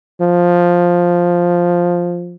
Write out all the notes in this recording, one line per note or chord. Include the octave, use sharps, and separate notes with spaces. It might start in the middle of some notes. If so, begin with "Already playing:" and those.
F3